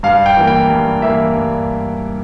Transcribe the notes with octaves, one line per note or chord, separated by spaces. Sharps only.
G2 F5
G5
E3 A#3
G5
G2
E3 A#3 E5
G2